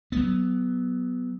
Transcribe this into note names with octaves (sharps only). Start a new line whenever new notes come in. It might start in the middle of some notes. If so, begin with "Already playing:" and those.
F#3 B3